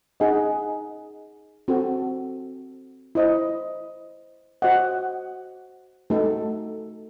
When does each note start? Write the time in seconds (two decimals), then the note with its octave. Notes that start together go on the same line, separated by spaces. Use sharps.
0.20 D#4 G#4 D#5 F#5
1.68 C4 F#4 A4
3.15 E4 C5 D#5
4.62 F#4 C5 D#5 F#5
6.10 A3 D#4 F#4 A4